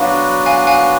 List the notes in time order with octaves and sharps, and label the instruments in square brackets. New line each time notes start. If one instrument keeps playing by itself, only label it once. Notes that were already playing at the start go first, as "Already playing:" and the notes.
Already playing: [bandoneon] F#3 B3 D4 F#4 B4 [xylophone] F5
[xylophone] F5 G#5
F5 G#5